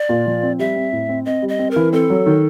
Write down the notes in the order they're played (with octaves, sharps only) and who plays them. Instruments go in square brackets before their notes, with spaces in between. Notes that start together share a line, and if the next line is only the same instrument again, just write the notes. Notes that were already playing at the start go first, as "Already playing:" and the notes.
Already playing: [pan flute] D5
[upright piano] A#2
F3
C4
[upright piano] G3 [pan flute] E5
[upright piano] C4
A2
C4
[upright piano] C4 [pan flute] D#5
[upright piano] G3
[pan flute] D#5
[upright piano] C4
[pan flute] A#4
[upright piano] E3
[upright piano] C4 [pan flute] A4
[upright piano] F#3
D#3